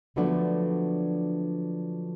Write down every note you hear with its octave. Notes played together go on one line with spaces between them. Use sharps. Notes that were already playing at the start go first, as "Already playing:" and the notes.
D3 F3 F#3 A3 B3 D4